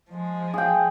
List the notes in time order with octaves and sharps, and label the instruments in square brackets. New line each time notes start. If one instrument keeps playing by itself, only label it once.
[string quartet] F3 G#3
[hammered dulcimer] G#4 G5